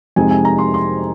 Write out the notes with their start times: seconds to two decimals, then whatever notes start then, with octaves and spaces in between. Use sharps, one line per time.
0.16 F2 C3 G#3 C4 D#4 G#5
0.31 G#5
0.45 A#5
0.58 C6
0.74 C6